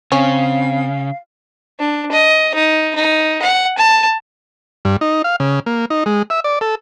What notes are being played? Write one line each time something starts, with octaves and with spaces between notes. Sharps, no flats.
C#3 C4 C#4 F5
D4
D#5
D#4
D#4
F#5
A5
G2
D#4
F5
C#3
A#3
D#4
G#3
E5
D5
A4